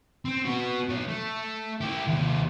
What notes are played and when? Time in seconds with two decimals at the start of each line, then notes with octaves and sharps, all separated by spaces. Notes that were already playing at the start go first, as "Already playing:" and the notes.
0.25 C4
0.45 B3 F#4
0.89 B2 C#5
1.09 A3
1.81 E4 G4
2.07 D#2 C3